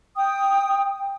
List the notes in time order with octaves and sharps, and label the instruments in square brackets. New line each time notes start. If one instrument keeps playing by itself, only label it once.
[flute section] G5 D#6